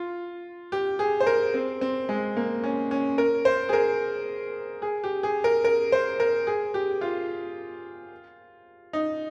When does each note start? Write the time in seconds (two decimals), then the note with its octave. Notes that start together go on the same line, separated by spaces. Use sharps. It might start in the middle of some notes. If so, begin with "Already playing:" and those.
Already playing: F4
0.72 G4
0.99 G#4
1.20 C5
1.27 A#4
1.54 C4
1.81 C4
2.09 G#3
2.37 A#3
2.64 C#4
2.91 C#4
3.18 A#4
3.45 C5
3.69 G#4
3.73 A#4
4.82 G#4
5.04 G4
5.23 G#4
5.44 A#4
5.64 A#4
5.92 C5
6.20 A#4
6.47 G#4
6.74 G4
7.01 F4
8.93 D#4